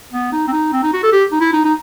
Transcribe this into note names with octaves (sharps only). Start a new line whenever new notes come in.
B3
D#4
C4
D#4
C4
D#4
F#4
A4
G4
D#4
E4
D#4
D#4